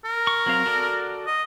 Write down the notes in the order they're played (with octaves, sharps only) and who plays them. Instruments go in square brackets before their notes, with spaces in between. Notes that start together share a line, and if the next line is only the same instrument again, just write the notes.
[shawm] A#4
[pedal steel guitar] C#6
F#3 C4 F5
F#4 A4 D5
[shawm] D#5